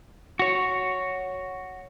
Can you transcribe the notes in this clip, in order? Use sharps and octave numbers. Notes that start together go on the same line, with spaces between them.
F#4 C#5